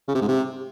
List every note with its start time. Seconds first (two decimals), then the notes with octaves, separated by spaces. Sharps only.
0.08 C#3
0.15 C3
0.22 G#2
0.28 C3